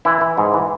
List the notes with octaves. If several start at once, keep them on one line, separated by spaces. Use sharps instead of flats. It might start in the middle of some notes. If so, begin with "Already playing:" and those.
E3 E4
E3
G#2
E3